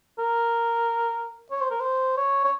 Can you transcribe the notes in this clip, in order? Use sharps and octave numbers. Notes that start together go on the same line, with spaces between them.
A#4
C#5
C5
A#4
C5
C#5
C#5